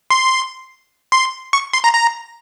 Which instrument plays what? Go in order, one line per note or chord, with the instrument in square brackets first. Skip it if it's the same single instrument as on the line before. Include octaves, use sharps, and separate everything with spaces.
[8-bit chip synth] C6
C6
C#6
C6
A#5
A#5